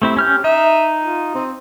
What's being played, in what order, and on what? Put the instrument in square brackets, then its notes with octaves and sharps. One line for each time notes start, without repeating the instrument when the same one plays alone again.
[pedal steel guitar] A3 C4 E4 [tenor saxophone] G4
[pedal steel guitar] C#4 F6 G6
[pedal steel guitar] D#4 [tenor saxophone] E5
[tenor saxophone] F4
C4